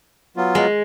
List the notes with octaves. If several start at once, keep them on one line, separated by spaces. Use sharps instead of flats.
F#3 B3 F4
G#3